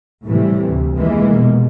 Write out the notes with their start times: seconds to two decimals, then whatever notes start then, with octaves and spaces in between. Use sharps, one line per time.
0.25 A2 C3 E3 G3
0.66 D2
0.97 F1 E3 G#3 A#3
1.35 B2